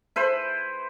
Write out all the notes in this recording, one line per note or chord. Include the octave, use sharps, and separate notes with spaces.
E4 B4 C5